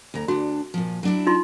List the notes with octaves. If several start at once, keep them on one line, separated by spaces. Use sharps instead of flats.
D2 A#5
D2 D4 F#4
A#2 F3
F#3 D4 E4
D#4 F4 C6